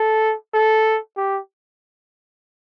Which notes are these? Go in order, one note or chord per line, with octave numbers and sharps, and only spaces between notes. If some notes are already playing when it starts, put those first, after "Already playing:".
Already playing: A4
A4
G4